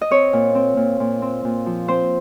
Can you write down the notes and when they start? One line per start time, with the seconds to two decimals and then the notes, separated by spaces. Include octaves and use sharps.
0.01 D#5
0.11 C4 C#5
0.33 A#2
0.55 C4
0.77 A#2
1.00 A#2
1.22 C4
1.45 A#2
1.66 F3
1.88 C4 C5